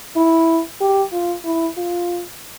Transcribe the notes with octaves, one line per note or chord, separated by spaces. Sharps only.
E4
G4
F4
E4
F4